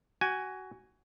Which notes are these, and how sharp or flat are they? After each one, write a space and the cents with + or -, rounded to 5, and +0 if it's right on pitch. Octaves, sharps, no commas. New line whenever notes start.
F#4 +20 G#5 +0